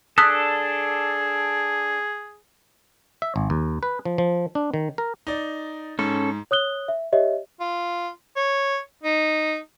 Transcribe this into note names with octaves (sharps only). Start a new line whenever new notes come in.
D4 G#4 A4 D#6 F#6 B6
E5
G#1
D#2
B4
F3
F3
D4
D#3
A#4
D#4 D5
G#2 C#4 A4
C#5 D#6 F#6 G7
E5
G4 C#5 D#5 E5
F4
C#5
D#4